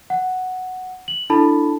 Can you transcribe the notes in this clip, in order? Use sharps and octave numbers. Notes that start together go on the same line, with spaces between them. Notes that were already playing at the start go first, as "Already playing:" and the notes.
F#5
F#7
D4 E4 A4 A5 B5